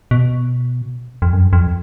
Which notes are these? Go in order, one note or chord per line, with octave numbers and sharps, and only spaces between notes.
B2
F2
F#2
F2